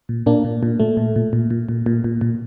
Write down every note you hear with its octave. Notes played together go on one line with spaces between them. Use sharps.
A#2
A#2 A#3 D4
A#2
A#2
A#2 A3
A#2
A#2
A#2
A#2
A#2
A#2
A#2
A#2